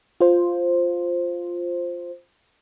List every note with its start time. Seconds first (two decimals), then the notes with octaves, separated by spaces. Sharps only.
0.21 F4 C5